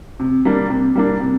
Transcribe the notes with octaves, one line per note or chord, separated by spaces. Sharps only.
C3
G3 A#3 D4
C3
G3 A#3 D4
C3